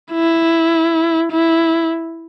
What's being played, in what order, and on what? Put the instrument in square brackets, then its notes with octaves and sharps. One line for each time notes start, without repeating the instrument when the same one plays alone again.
[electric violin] E4
E4